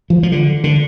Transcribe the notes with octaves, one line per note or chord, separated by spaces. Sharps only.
F3
F3
D3
D3